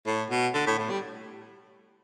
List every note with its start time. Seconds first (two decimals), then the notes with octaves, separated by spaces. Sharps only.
0.06 A2
0.30 B2
0.54 D3
0.67 A2
0.78 A2
0.90 G3